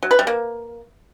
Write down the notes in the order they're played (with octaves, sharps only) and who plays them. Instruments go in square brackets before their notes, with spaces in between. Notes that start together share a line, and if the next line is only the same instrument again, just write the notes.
[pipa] F#3
B4
G3
A#3